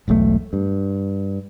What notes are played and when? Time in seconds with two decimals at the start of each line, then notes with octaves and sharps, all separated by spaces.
0.08 E1 B1 C3 A3
0.53 G2